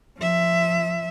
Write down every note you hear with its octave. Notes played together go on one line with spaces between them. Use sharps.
F3 E5